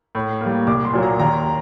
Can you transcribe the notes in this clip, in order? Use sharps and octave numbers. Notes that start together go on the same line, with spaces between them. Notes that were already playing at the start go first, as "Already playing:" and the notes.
A2
A#3
G3
C2 D6
C6
A#2 F#3 A#3
A#5
D#2 A#5